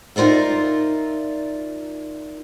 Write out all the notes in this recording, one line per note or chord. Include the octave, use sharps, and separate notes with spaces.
D#4 F4 A#4 D5 E5